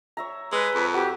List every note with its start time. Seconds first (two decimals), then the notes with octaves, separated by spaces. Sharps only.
0.17 C#5 E5 A#5
0.52 G#3 B4 E6
0.75 F2
0.94 F#4 G4 B4